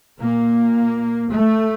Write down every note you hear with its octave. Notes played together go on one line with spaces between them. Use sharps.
A#2 A#3
A3